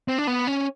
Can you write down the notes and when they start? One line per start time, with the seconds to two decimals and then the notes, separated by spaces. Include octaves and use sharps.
0.08 C4
0.18 D4
0.27 B3
0.47 C#4